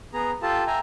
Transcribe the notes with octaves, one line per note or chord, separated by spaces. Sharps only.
B3 G#4 A#5
F4 G4 A4 A5
E5 G5 G#5 A#5